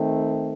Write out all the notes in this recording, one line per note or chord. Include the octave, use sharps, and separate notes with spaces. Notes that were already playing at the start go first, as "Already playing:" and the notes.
Already playing: D#3 A3 C4